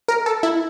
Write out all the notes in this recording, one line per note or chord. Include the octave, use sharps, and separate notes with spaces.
A#4
A4
E4